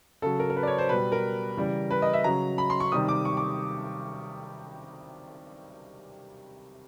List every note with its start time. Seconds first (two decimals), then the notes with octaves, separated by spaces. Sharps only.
0.22 C#3 F#3 A4
0.39 A#4
0.50 A#4
0.56 B4
0.63 D5
0.67 C#5
0.78 C5
0.89 B2 G3 B4
1.12 A#4
1.57 C#3 E3 G3
1.91 B4
2.02 D#5
2.13 E5
2.24 C#3 F#3 A#5
2.58 B5
2.70 C6
2.80 C#6
2.92 C3 D#3 G3 D#6
3.09 D6
3.25 C#6
3.37 D6